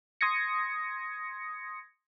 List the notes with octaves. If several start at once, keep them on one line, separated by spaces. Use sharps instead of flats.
C6 D#6 G#6 A#6 C#7